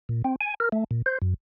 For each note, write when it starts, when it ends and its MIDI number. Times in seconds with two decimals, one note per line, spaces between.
0.09 0.22 46
0.25 0.36 60
0.41 0.54 80
0.60 0.69 70
0.72 0.84 57
0.91 1.02 46
1.06 1.18 72
1.22 1.34 42